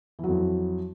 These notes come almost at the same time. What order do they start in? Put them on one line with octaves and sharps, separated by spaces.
E3 F#3 F2